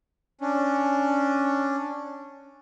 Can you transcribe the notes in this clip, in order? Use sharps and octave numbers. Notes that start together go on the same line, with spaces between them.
C#4 D4